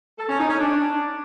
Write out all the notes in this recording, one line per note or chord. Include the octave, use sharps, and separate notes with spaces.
A4
C#4
D#4
C#4
D4